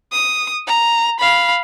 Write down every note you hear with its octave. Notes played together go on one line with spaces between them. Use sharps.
D#6
A#5
F5 B5